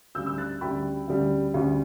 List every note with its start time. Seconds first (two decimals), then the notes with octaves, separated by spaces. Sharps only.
0.15 D2 C#3 G3 E6 G6
0.26 E6 G6
0.38 F#6 A6
0.61 D2 C#3 G3 G5 B5
1.08 D2 C#3 G3
1.54 D2 C#3 G3